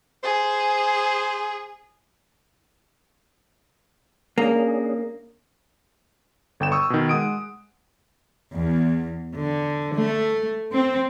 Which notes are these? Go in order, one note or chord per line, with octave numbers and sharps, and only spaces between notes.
G#4 C5
A#3 C#4 D4 G#4
G1 D3 G5 G6 E7
C#6 D#6 E6
B2 D#3
G#3 F#5 D#6 D7
E2
D3
A3
C4